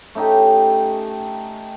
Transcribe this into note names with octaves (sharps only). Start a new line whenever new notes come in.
A3 C#4 D#4 G4